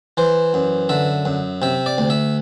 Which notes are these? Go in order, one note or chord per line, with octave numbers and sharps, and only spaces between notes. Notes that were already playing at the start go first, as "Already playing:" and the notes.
E3 C5
F#2
D3 E5
F#2
C3 E5
D5
D2
E5